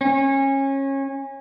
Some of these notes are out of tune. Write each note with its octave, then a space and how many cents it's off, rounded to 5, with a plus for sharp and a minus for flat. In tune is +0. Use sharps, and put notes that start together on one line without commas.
C#4 -25